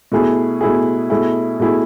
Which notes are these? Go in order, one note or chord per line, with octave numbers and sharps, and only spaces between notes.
B2 A3 E4 G#4
B2 A3 E4 G#4
B2 A3 E4 G#4
B2 A3 E4 G#4